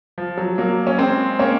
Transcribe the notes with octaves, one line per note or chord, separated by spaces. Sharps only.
F3
F#3
F#3 A#3
C#4
G#3 C4
A#3 C#4